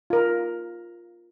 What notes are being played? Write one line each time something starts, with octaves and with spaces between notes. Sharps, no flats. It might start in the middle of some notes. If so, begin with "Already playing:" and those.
F4 A#4